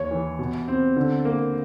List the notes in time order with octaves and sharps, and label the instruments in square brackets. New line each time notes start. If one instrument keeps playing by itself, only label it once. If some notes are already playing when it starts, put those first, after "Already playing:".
Already playing: [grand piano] D#2 [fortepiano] C#5
[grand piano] E3
B2
C4
D3
A#3